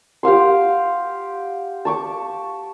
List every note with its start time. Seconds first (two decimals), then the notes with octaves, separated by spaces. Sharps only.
0.23 G4 F5 F#5 C6
1.85 A5 C#6 D6